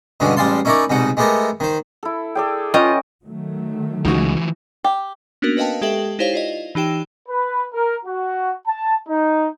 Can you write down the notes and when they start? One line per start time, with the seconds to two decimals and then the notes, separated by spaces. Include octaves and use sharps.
0.20 G2 B2 D3 G#3 C#4
0.37 A1 G3 G#3 F5 A5 C6
0.65 C#4 D#4 E4 A#4 C#5 D5
0.90 C2 G#2 B2 D#4 F#5
1.17 G#3 A3 B3 G4 A4 A#4
1.60 D#3 C5
2.03 E4 A4
2.35 G#4 A4 D5 G5
2.74 C#4 F4 B4 D#5 G5
3.24 D#3 F#3 A3
4.05 C#2 E3 F3 D#4 F#4
4.84 G4
5.42 A#3 B3 C#4 D4 F#4 A#4
5.57 A#4 B4 D#5 F5 G5 A5
5.82 G#3 G4 A4 E5 G5 F#7
6.19 D#4 E4 G4 C5 C#5 F5
6.34 F4 D5 D#5
6.75 E3 D#4 G4 G5 E7
7.29 B4
7.73 A#4
8.06 F#4
8.66 A5
9.07 D#4